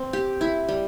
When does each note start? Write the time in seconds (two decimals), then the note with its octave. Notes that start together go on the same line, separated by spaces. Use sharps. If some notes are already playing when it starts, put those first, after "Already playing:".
Already playing: C4
0.13 G4
0.41 E4
0.68 G3